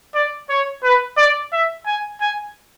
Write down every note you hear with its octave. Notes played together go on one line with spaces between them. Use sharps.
D5
C#5
B4
D5
E5
G#5
G#5